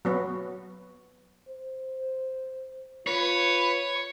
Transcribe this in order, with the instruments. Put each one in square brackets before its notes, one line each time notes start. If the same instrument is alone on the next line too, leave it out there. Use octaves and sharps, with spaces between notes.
[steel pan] F#3 B3 F#4
[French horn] C5
[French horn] F4 [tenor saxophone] B4 [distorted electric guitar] C#5